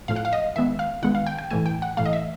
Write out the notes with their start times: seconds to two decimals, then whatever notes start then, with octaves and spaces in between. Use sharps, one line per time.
0.08 A2 F3 A3 F5
0.16 F#5
0.25 F5
0.33 D#5
0.56 D#3 G#3 B3 E5
0.79 F5
1.03 D#3 G#3 B3 F#5
1.15 F5
1.26 G5
1.39 G5
1.51 A2 E3 A3 G#5
1.66 G5
1.82 F#5
1.97 A2 E3 A3 F5
2.05 D#5
2.13 E5